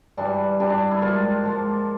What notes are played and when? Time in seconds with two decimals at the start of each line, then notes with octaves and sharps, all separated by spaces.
0.17 G2 E3 G3 D4
0.60 G2 E3 G3 D4
0.70 D4
0.91 E4
1.01 G#2 F3 A#3 F4
1.43 G#2 F3 A#3